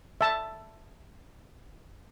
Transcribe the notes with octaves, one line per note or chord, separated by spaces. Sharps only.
E5 A5